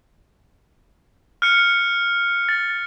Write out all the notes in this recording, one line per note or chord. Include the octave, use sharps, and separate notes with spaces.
F6 F#6 C#7
A6